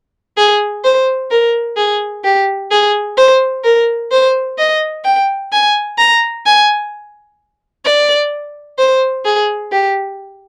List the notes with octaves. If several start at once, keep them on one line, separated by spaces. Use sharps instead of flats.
G#4
C5
A#4
G#4
G4
G#4
C5
A#4
C5
D#5
G5
G#5
A#5
G#5
D5
C5
G#4
G4